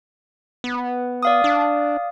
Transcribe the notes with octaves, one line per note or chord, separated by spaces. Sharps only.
B3
D5 F5 D#6
D4